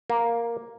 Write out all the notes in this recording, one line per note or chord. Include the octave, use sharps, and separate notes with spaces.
A#3